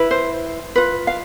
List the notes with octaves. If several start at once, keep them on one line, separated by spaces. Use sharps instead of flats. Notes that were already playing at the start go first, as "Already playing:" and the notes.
Already playing: E4 B4
C5
F4 B4
F5